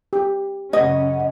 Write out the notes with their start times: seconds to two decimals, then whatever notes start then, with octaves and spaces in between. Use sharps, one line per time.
0.13 G4
0.73 F#2 C#3 C#4 D#5 F#5